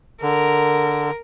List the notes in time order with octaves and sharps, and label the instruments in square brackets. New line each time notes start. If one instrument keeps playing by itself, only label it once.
[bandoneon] D3 [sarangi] A#4